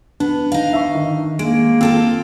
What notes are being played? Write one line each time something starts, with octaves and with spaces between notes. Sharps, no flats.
B3 D4
D#4 F5
E5 C#6
D#3
G#3 A#3 D7
C4 F4 A4 G5